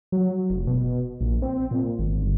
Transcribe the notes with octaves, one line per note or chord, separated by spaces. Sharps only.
F#3
F1
B2
A#1
C4
A#2
G#1
G1